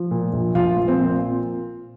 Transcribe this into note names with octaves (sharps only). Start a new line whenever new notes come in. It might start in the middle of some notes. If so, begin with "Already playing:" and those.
Already playing: F3
A#2
A#1
A#1 F4
F3
C4
A#2